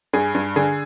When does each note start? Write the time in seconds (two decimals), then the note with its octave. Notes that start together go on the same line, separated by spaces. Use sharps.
0.13 G2 G#4
0.35 G2
0.56 D3 G#4